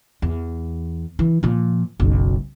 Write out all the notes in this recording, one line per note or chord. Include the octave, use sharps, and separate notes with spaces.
E2
E3
A#2 F3
F#1 B1